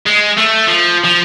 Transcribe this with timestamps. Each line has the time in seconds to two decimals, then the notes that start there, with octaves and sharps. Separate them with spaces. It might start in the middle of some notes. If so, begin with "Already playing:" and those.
0.06 G#3
0.37 A3
0.67 F3
1.05 F3